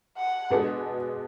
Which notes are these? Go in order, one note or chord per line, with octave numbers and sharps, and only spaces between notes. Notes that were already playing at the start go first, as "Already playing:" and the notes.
F#5
B2 G#3 B3 D4 F#4